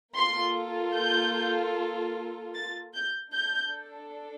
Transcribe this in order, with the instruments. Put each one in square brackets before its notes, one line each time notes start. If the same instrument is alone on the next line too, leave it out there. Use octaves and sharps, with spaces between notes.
[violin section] A#3 F4 A4 C6
G6
A6
G6
D4 A4 G6